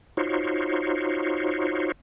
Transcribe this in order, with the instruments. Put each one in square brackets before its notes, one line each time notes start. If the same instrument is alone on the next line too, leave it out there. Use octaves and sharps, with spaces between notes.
[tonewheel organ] D#4 F4 F#4 C5 C#5